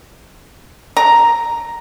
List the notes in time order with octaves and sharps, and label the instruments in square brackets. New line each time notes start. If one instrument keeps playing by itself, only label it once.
[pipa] A#5